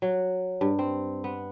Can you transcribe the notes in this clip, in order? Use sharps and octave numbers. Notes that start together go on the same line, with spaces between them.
F#3
G2
C4
B3